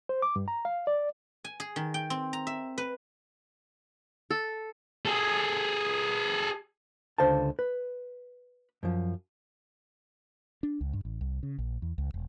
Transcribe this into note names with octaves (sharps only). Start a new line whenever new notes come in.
C5
D6
G2
A#5
F5
D5
G#5
G#4
D#3
G5
C4
A#5
E5
B4
A4
G#4 A4
C#2 D3 C5 F5 A5
B4
F#2 F3
D4
C#2
G2
A1
C2
C#3
A#1
E2
C#2
E1